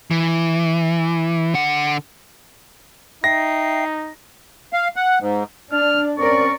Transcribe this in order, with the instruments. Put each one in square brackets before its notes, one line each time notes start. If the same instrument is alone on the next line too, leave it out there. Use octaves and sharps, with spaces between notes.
[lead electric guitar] E3
D3 F#5
[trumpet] D#4 [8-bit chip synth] E5 G5 C7 [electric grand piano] A#6
[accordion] F5
F#5
G#2
[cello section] D4 [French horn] D5 [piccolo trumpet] F6
[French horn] C4 [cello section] C#4 A#4 D5 [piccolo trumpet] C#6